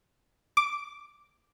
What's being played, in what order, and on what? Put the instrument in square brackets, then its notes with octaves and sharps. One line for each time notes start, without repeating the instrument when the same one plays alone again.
[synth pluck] D6